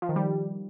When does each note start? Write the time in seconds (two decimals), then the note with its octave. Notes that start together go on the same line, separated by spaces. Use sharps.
0.02 F3
0.09 D#3
0.16 G3